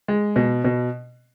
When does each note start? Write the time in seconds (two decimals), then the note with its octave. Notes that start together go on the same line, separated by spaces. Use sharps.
0.08 G#3
0.36 B2
0.64 B2